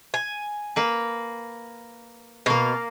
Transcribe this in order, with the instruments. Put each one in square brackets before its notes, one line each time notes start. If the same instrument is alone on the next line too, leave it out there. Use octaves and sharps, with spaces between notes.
[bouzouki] G#5
[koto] A#3 B4
[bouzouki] B2 [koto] A#3 F5